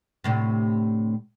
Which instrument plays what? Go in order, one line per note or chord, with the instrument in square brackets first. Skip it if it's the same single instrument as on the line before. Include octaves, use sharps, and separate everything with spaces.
[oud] D2 A2 C3